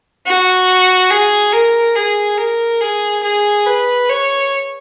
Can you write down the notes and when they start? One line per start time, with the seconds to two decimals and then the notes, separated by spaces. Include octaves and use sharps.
0.26 F#4
1.10 G#4
1.52 A#4
1.95 G#4
2.38 A#4
2.81 G#4
3.23 G#4
3.66 B4
4.09 C#5